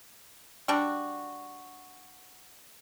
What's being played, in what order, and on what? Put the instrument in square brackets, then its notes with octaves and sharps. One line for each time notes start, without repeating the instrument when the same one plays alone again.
[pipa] G3 D4 F#4